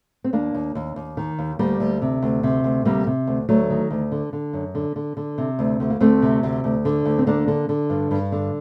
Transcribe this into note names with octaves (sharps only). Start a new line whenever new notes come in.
C4
D#2 A#3 D4
D#2
D#2
D#2
D#3
D#2
D2 G3 A#3
D2
C3
D2
C3
D2
C3 G3 A#3
C3
D2
D2 F#3 A3
D#3
D2
D3
D3
F#2
D3
D3
D3
C3
D2
D2
A#3
D2 A3 C4
C3
D2
D2
D3
D2
C4
D3 A#3 D4
D3
D3
G2
G2
D3